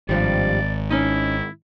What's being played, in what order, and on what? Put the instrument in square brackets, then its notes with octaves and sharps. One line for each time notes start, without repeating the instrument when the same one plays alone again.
[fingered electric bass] G#1 [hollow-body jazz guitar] G2 F3 G3 [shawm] D5
[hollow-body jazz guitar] C#4 D#4 [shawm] E4